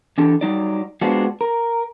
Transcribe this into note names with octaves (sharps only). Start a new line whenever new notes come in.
E3 D4 G4 A4
F#3 G3 D#4 D5
G#3 B3 C4 D4 F4 F#4
A#4